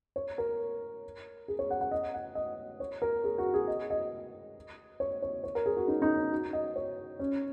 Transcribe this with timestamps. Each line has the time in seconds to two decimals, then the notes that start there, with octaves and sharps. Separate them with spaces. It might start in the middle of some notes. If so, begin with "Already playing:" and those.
0.16 C#5
0.38 A#4
1.48 G#4
1.59 C#5
1.70 F#5
1.81 F#5
1.91 D#5
2.14 F#5
2.35 D#5
2.80 C#5
3.02 A#4
3.24 G#4
3.38 F#4
3.54 G#4
3.68 D#5
3.90 D#5
5.00 C#5
5.22 C#5
5.44 C#5
5.55 A#4
5.66 G#4
5.77 F#4
5.88 D#4
6.02 D#4
6.17 C#4
6.32 F#4
6.53 D#5
6.76 C#5
7.19 C#4